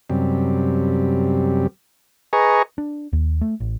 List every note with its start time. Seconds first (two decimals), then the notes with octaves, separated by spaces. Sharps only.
0.10 F#2 C3 G3
2.33 G#4 B4 D#5 G#5 A#5 C#6
2.78 D4
3.13 D#2
3.41 A3
3.60 A1